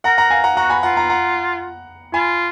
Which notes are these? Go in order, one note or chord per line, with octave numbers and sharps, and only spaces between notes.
A#4 F#5 A#5
F#5 A#5
F5 G#5
F#5 A#5
F#4 F#5 A#5
G#5 B5
F4 F#5 A#5
F#5 A#5
F#5 A#5
F4 G#5 B5